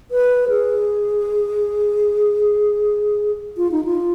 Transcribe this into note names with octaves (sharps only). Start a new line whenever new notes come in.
B4
G#4
F4
D#4
F4